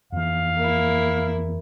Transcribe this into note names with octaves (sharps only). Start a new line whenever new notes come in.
F2 E3 F5
A#3 E4